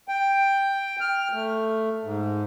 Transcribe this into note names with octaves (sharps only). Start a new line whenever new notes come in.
G5
F6
A3
G#2